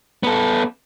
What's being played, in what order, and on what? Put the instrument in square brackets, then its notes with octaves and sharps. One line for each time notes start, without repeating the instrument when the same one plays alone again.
[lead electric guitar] B3 A4